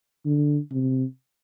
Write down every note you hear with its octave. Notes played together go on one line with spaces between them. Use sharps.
D3
C3